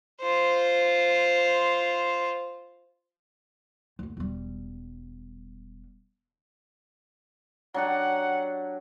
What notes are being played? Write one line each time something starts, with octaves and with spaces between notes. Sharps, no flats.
F4 C5
F#1 D2
E1 G3
F#3 D4 G4 F#5